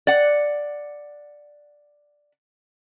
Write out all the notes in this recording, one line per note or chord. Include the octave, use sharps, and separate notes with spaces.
D5 F#5